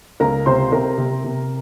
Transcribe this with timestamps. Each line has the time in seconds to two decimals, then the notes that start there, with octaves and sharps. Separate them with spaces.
0.20 C#2 A#4 A#5
0.46 C3 C5 C6
0.72 C3 A#4 A#5
0.98 C3
1.24 C3